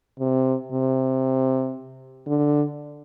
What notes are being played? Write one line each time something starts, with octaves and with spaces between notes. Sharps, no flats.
C3
C3
D3